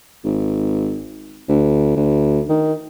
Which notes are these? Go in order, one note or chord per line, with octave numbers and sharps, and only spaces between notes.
G#1
D2
D2
D#3